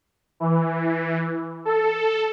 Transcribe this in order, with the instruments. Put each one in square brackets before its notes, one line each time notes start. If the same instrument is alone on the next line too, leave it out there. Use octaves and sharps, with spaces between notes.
[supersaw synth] E3
A4